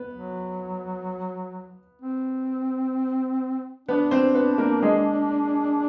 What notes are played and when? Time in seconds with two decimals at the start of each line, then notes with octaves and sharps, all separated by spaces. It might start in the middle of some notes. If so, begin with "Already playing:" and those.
Already playing: B3 B4
0.13 F#3
2.02 C4
3.88 B3 D4 B4
4.11 C4 C5
4.34 B3 B4
4.58 A#3 A#4
4.83 G#3 G#4